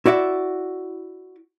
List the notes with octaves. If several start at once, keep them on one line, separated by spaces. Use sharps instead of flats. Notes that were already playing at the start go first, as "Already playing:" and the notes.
E4 F#4 D5 E5